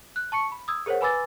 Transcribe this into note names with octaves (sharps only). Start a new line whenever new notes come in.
F#6
A5 C#6 C#7
B5
D#6 E6 G#6
G#4 A#4 C5 C#5 F#5
B4 G#5 B5 D6 E6 A6